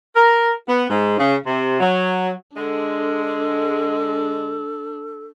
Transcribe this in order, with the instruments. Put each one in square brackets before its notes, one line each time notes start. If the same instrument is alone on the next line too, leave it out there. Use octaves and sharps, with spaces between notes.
[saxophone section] A#4
B3
G#2
C#3
C3
F#3
[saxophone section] D3 G#3 [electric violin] D4 [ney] A4